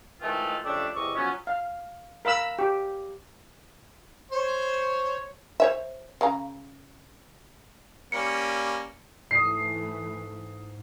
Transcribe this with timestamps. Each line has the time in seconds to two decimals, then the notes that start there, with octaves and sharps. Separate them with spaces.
0.21 D#3 E3 G#3 A3 C4 F4
0.64 F2 C#3 A3 D4 G4 E6
0.95 E2 C3 D#5 C#6 D6 E6
1.15 F3 F#3 B3 C#4
1.47 F5
2.25 A#4 F5 B5 E6
2.59 G4
4.32 C5 C#5 C#6
5.60 C5 C#5 E5
6.21 C#3 F5 A#5
8.12 G3 A#3 C#4 C#7
9.31 G#2 E3 A3 D#6 C7